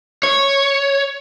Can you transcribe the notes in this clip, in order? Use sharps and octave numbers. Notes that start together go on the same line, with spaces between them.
C#5